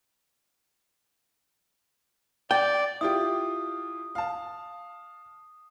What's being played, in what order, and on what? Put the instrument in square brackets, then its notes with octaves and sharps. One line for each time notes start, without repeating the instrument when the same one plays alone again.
[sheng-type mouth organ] D5 [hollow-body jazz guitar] G5
[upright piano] E4 F4 G4 [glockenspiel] D#6
[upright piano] F5 A5